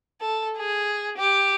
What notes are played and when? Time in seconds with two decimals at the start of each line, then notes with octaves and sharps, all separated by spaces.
0.21 A4
0.58 G#4
1.17 G4